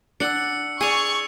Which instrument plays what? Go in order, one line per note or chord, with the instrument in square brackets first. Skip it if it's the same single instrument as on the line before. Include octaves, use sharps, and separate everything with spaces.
[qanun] D4 F#5 [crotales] E6 C#7
[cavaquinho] G#4 D5 [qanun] G#5 [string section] C#6 [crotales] E6 F7